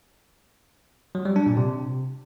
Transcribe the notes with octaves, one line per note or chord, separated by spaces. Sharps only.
F#3
G3
D4
A#2
C3